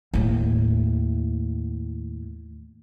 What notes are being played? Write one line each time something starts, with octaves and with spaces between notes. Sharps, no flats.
D#2 A2